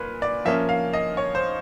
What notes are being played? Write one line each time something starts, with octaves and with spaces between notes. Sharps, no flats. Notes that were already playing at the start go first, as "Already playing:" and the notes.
Already playing: A#2 B4
D5
F3 A#3 C#4 E5
F5
D#5
C#5
C5